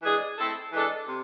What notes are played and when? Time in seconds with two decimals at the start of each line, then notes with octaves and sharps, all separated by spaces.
0.03 E3 G#3 D4 G#4
0.38 A3 C4 E4 A4
0.73 E3 G#3 D4 A4
1.08 C3